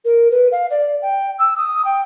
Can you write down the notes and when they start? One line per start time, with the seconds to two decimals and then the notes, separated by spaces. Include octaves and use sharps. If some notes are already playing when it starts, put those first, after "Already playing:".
0.04 A#4
0.30 B4
0.52 F5
0.70 D5
1.02 G5
1.38 E6
1.57 D#6
1.84 G5